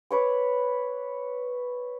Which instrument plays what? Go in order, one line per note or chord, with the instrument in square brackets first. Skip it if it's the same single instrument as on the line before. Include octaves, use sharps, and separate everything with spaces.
[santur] B4 C#5 D6